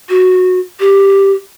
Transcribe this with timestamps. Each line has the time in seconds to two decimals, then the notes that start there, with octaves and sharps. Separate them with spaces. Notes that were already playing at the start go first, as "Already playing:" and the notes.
0.10 F#4
0.80 G4